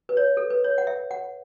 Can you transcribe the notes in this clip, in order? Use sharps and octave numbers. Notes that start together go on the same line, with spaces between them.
B4
C#5
A4
B4
C#5
F#5
E5
F#5